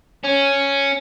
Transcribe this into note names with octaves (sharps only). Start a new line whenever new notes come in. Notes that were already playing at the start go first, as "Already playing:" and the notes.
C#4